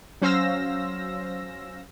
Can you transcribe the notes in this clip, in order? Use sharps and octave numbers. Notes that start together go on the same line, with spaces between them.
F#3 C#4 C5 F5 E6 A#6